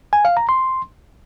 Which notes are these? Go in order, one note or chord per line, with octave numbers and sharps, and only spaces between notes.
G#5
F5
A#5
C6